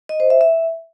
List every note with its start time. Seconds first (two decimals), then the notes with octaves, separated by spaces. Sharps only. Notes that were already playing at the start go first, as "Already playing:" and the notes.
0.09 D#5
0.20 C5
0.30 E5
0.41 E5